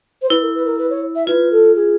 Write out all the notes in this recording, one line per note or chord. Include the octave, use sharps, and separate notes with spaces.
C5
E4 B4
A#4
B4
A#4
B4
C#5
E5
F4 B4
A4
G#4